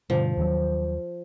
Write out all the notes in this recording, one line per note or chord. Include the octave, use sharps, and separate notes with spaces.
G2 B2 D3 F3
D#2 D#3 F#3